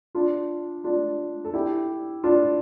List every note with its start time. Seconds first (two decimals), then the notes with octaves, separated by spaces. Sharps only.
0.15 D4 F4
0.84 D4 F4
1.45 A4
1.53 E4 G4
2.24 D4 F4